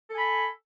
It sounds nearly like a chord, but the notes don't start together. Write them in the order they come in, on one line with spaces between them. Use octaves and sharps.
A4 G#5 B5